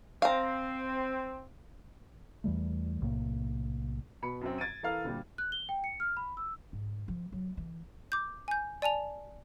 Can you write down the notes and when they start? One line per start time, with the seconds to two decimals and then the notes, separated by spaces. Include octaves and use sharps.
0.22 C4 F5 A#5
2.44 E2 E3 G3 A3
3.01 B1 A2 C3 A#3
4.22 B2 B5 C#7
4.41 F#2 F#3 C4
4.58 G#6 A6 D7 D#7
4.83 E3 A4 A#4 F5 F6
5.05 D2 A#2 G3
5.38 F#6
5.52 G7
5.69 G5
5.84 C#7
6.00 F6
6.17 B5
6.37 E6
6.73 G#2
7.08 F3
7.32 F#3
7.57 E3
8.12 D6 G6
8.48 G#5 G6
8.82 D5 G#5 A5 F7